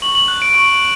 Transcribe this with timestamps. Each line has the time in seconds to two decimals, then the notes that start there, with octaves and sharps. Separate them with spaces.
0.02 C#6 F#7
0.15 F#7
0.28 F#6
0.42 D7
0.54 C#6 D7